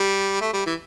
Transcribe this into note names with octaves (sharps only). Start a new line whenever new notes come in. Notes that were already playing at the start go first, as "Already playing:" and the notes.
Already playing: G3
A3
G3
E3